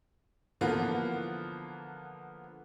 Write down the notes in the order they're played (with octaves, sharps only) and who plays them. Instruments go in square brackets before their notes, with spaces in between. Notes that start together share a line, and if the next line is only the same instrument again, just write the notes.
[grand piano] D3 E3 F3 A#3 B3